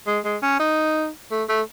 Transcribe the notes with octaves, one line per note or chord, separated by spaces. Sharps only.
G#3
G#3
C#4
D#4
A3
A3